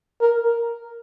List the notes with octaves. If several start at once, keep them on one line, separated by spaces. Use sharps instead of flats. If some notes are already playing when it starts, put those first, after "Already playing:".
A#4